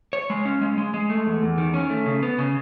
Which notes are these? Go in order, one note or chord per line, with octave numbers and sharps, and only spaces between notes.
C#5
G#3
C#4
G#3
G#3
G#3
A3
E2
E2
D#3
C#4
A3
C#3
B3
C#3